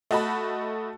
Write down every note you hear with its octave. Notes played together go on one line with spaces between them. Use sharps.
A3 F#4 D#5 A5 B5